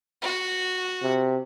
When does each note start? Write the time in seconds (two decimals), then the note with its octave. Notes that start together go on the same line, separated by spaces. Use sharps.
0.22 F#4
1.03 C3